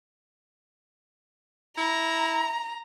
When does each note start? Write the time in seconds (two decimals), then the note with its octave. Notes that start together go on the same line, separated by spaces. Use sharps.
1.77 E4 A#5